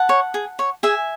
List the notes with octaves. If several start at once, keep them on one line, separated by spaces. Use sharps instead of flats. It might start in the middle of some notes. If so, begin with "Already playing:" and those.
Already playing: F#5 A5
C#5
G#4
C#5
G#4 E5 G#5